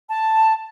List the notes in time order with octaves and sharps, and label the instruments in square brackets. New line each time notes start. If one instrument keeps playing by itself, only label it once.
[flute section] A5